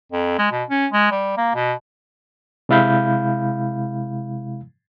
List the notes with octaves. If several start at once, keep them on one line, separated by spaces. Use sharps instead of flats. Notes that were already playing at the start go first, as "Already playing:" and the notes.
F2
G#3
B2
C#4
G#3
G3
A#3
B2
C3 G#3 E4 F5 B5 G6